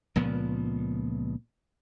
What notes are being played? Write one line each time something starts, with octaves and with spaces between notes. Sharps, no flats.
C#2 A#2 F3 B3